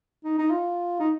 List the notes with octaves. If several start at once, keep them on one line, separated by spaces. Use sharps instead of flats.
D#4
D#4
F4
D#4